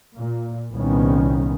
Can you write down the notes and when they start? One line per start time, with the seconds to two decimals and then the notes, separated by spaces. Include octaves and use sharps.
0.17 A#2
0.72 C2 A#2 D#3 B3 C#4